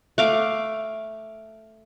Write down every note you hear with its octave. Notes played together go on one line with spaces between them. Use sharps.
A3 F5 D6